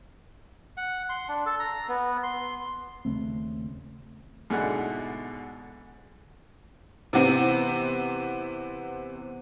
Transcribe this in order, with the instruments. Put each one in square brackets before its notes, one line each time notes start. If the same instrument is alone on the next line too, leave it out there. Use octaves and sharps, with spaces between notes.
[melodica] F#5
C6
D4
A4
A#5
B3
C6
[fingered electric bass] D#2 C#3 A3 C4
[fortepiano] G#2 B2 D3 G#3 E4 F#5
[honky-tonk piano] C3 E3 B3 C4